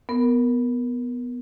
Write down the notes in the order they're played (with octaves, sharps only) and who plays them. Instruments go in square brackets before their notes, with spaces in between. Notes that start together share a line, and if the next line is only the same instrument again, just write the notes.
[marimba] B3 A#4